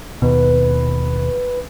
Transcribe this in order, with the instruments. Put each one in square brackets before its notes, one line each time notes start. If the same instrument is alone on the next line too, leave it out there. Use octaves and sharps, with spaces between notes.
[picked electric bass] D#2 B2 [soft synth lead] B4